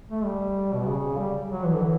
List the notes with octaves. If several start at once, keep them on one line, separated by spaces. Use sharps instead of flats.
A3
G3
B2
C#3
G3
F#3
E3
D3
E3